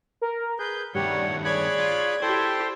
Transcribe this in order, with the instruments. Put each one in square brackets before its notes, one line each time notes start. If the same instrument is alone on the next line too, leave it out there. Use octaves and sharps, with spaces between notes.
[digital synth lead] A#4
[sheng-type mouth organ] G#4 B4 [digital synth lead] G6
[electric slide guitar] G2 D#3 A3 [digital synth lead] G3 [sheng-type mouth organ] C#5 F#5
[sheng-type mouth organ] G#4 B5 F#6 [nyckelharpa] C#5 D5 [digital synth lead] G#6
[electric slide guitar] F4
[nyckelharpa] E4 G4 [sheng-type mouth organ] A4 G5 C6 [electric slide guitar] C5